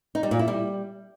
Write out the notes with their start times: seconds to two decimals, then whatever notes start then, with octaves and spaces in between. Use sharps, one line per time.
0.15 D#4
0.23 G3
0.31 A#2
0.39 E4
0.48 G3